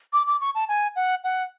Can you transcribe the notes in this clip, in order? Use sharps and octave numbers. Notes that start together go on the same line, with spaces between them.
D6
D6
C#6
A5
G#5
F#5
F#5